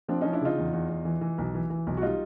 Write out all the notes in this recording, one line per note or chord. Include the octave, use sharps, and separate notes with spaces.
F3 C4 D4
F3 C#4 D#4
D4 E4
C#3 D#4 F4
E2
E2
E2
E3
E3
B1
E3
E3
B1
F#4
G3 D#4 F4